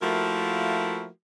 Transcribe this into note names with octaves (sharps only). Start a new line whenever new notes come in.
F3 A3 A#3 E4 F#4 A#4